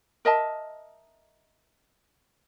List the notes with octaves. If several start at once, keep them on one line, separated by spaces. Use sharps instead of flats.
A#4 D#5 E5 A5